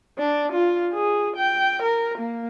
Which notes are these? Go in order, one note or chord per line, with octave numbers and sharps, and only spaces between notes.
D4
F4
G#4
G5
A#4
A#3